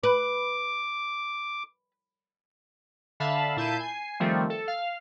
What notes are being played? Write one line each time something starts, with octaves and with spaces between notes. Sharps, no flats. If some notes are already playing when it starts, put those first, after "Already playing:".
B4 D6
D3 E5 F5 A5 B5
A#2 E4 A5 G6 C7 D#7
G#5 C7
D#3 F3 G3 A3 C4
A4
F5